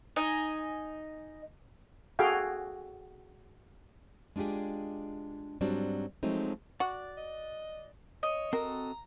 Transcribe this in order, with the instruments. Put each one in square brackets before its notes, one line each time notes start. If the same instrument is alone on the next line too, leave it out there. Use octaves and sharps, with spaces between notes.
[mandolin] D#4 D#5 G#5
[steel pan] F#4 G#4 A4 F5 G5
[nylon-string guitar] G#3 D4 F4 G4 G#4
G#2 F#3 G3 C4 D4
F3 F#3 G#3 A3 C4 D#4
[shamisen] F#4 [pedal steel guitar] D5 D6 F#6
[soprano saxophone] D#5
[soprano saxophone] C#5 [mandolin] D#5
[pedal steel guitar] C4 F#4 A4 [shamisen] A#4 [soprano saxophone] A#5